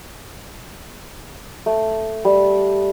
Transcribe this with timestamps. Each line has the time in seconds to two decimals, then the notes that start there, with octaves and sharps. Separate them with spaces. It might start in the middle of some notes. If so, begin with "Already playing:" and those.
1.66 A3
2.25 G3